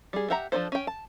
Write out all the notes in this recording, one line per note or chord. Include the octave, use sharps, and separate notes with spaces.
G3 G#4
G4 E5 F#5 A#5
F3 D4 E4 A4 C5
C#4 G5
A5